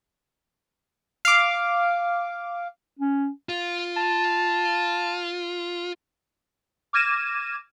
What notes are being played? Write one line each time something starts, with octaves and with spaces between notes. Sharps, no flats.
F5 D6
C#4
F4
A5
D6 F6 G#6 A#6 D#7 E7